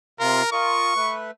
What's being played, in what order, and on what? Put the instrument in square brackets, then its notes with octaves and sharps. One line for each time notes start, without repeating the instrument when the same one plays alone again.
[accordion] C3 F4 C6 [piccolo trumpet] A#4
[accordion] F4 A#4 D#5 [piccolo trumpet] C#6
[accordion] A3 B4